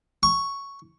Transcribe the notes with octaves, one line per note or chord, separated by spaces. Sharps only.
C#6